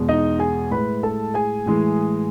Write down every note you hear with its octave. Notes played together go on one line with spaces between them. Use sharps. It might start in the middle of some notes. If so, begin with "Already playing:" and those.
Already playing: E2 B2 G#3
D#4 D#5
G#4 G#5
A2 G#3 B4 B5
A4 A5
G#4 G#5
A2 E3 G#3